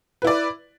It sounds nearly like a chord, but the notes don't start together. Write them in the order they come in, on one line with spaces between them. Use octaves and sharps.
B4 E4 D5